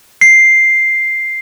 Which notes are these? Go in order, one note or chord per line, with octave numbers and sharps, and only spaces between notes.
C7